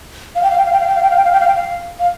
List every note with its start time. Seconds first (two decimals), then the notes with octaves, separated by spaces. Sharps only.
0.36 F5
0.43 G5
0.51 F5
0.58 G5
0.66 F5
0.73 G5
0.80 F5
0.87 G5
0.96 F5
1.03 G5
1.11 F5
1.17 G5
1.25 F5
1.33 G5
1.40 F5
1.48 G5
1.55 F5
2.00 F5